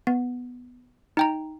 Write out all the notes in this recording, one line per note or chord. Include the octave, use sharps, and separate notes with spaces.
B3
D#4 G5 A#5